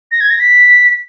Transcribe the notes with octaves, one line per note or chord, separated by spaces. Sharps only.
A#6
G#6
A#6
B6